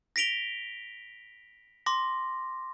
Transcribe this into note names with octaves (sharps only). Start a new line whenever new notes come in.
A#6 B6 D7 F7 G7
C6 D6 A#6